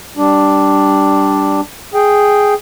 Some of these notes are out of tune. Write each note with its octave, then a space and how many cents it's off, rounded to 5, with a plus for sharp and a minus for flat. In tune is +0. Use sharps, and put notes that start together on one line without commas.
G3 +0 D4 +0
G#4 +0 G5 +0